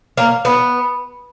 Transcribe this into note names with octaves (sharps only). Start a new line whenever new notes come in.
A#3
B3